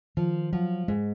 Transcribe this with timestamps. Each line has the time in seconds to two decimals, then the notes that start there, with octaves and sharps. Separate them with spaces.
0.17 D#3 F3
0.53 F3 F#3
0.88 G#2 G#3